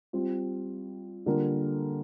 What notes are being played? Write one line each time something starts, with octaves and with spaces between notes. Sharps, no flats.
G3 C4 F4
D3 G3 A#3 F4 A#4